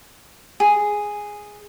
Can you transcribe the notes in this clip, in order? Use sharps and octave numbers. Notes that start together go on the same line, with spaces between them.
G#4